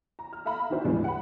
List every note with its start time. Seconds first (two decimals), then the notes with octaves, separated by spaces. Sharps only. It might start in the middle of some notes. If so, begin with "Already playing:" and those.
0.19 A#5
0.33 F6
0.45 A4 E5 F5 A#5 B5
0.70 D#3 D4 F#4 C5 E5
0.84 E2 A2 D3 F3 G#3 B3
1.04 F#5 B5